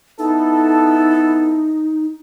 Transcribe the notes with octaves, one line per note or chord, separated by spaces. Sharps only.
B3 D#4 E4 A4